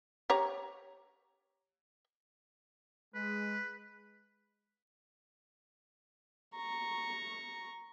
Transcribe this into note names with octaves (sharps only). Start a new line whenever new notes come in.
G4 C#5 A#5
G#3 B4
A#5 C#6